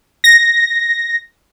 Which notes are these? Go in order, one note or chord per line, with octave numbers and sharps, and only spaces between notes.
A#6